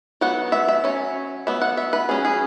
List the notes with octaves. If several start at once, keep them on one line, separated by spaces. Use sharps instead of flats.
F#3 B3 F#5
E5
E5
F#3 C#4 C#5
F#3 B3 E5
F#5
E5
B4
F#3 C#4 G#4
G#4